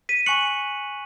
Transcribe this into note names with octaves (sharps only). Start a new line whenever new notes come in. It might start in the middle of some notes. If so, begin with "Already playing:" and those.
B6 D#7
G#5 C#6 F#6 C#7 F#7